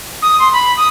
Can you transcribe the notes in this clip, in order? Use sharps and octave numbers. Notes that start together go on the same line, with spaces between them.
D#6
C6
B5
D#6